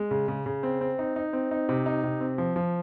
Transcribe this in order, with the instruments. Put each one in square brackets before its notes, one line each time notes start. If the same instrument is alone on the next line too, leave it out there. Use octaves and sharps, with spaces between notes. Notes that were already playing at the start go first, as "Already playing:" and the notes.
Already playing: [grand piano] G#3
C#3
C#3
C#3
C4
C4
D#4
D#4
C4
D#4
C3
D#4
C3
C4
F3
F3